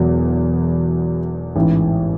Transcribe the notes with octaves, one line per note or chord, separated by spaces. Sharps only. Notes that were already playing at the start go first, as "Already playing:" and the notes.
Already playing: E1 E2 B2 F#3
A1 G#2 E3